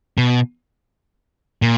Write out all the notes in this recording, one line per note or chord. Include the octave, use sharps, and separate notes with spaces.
B2
A#2